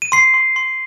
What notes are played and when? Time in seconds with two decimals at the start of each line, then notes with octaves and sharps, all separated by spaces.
0.02 D#7
0.12 C6 C7
0.34 C6
0.56 C6